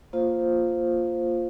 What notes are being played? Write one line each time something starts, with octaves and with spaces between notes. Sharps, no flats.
A#3 F4 C5 F5